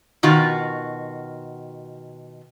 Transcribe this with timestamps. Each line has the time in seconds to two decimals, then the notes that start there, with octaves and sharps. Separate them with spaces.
0.23 B2 D#3 F4 F#4